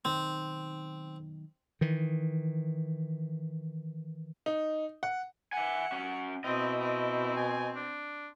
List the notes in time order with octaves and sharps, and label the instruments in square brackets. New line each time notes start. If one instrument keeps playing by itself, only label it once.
[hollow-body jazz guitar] B1 D#3 [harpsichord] C4
[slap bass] D#3 E3
[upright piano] D#4
F#5
[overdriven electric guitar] E5 G#5 [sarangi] F#5
[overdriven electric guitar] C#4 F#4
[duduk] B2 [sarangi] C4 [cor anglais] E4 [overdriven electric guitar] D#5
[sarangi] C4
[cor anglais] G#5
D4